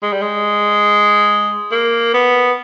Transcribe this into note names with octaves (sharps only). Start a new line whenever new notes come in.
G#3
G3
G#3
A#3
B3